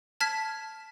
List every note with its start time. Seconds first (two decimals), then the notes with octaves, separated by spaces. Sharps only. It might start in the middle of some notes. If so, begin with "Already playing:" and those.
0.20 A5 F6 G#6 B6